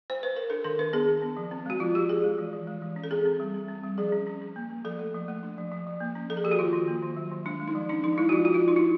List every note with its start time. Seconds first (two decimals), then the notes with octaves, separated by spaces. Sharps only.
0.10 C5
0.23 B4
0.36 A#4
0.50 D4 A4
0.64 D#3 A#4
0.79 D4 B4
0.93 B3 G#4
1.08 D4
1.22 B3
1.37 F3
1.51 C4
1.66 G#3 F#4
1.80 F3 F4
1.95 F3 G4
2.09 F3 G#4
2.24 G#3
2.38 E3
2.53 E3
2.67 G#3
2.82 E3
2.96 C#4
3.04 A4
3.11 C4 G#4
3.25 C4
3.40 G3
3.54 C4
3.69 C4
3.84 G3
3.98 F3 G#4
4.12 C#4
4.27 C#4
4.41 C#4
4.56 A#3
4.70 A#3
4.85 F3 A4
4.99 A3
5.14 F3
5.28 A3
5.43 D4
5.58 F3
5.72 F3
5.87 F3
6.00 A#3
6.15 C#4
6.30 F3 A4
6.37 G#4
6.44 F3 G4
6.51 F#4
6.59 D#3 F4
6.73 D#3
6.88 A#3
7.02 D#3
7.16 F#3
7.31 D#3
7.45 G#3 D4
7.60 G#3
7.68 D#4
7.75 F3
7.89 C#4 D4
8.04 F3 D#4
8.18 G#3 E4
8.29 F#4
8.32 F3 F4
8.45 F3 F#4
8.54 F4
8.62 F3
8.68 D#4
8.76 D4 E4